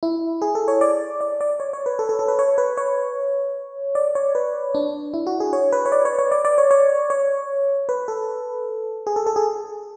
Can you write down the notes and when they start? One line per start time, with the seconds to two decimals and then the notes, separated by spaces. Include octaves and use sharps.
0.03 E4
0.42 G#4
0.55 A4
0.68 C#5
0.81 D5
1.21 D5
1.41 D5
1.60 C#5
1.73 C#5
1.86 B4
1.99 A4
2.09 A4
2.19 A4
2.28 B4
2.39 C#5
2.58 B4
2.77 C#5
3.95 D5
4.15 C#5
4.35 B4
4.75 D4
5.14 E4
5.27 F#4
5.40 G#4
5.53 C#5
5.72 B4
5.86 C#5
5.92 D5
6.05 C#5
6.19 C#5
6.32 D5
6.45 D5
6.58 C#5
6.71 C#5
7.10 C#5
7.89 B4
8.08 A4
9.07 G#4
9.16 A4
9.26 A4
9.36 G#4